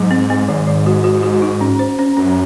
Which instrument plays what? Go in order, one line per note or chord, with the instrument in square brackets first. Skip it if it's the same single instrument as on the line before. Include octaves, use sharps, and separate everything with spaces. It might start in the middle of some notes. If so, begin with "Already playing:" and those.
Already playing: [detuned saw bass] G#2 [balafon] F#3
[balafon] C4
C4
[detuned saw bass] G#2 [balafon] D#3
[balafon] D#3
F#4
F#4
F#4
D#4
C#4
C5
C#4
[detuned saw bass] F#2 [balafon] C#4